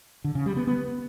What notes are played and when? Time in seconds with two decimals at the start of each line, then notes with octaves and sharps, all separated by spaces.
0.24 D3
0.35 C#3
0.46 G3
0.57 B3
0.67 B3